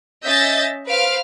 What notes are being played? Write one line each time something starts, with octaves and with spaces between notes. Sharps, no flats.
C#4 D#5 E5 G6 A6
B4 C5 F5 F6 D7